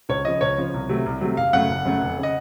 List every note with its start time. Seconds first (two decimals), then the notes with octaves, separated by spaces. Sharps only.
0.09 C#2 C#5
0.25 C#3 F3 D#5
0.41 C#2 C#5
0.58 C#3 F3
0.74 C2
0.89 C3 F#3 A3
1.06 C2
1.21 C3 F#3 A3
1.37 F#1 F5
1.53 F#2 C#3 A3 F#5
1.69 F#1
1.85 F#2 C#3 A3
2.01 F1
2.18 C#3
2.23 D#5